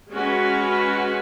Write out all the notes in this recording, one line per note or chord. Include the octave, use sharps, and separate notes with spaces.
G#3 C#4 F#4 B4